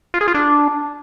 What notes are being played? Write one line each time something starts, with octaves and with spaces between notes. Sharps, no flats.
F4
G#4
F4
D4